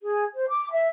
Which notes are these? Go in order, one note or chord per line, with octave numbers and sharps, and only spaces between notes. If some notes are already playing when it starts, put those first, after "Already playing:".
G#4
C5
D6
E5